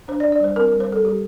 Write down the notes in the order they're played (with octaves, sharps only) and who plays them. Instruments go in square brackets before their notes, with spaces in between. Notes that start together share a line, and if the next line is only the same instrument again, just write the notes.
[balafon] D4 C5
D5
D4
D5
G3 C5
C4 A#4
G3 A#4
C5
G3 A4
G3 G4